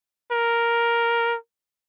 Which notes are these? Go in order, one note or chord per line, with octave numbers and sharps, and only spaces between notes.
A#4